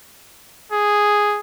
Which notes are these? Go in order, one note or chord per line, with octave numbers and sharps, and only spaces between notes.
G#4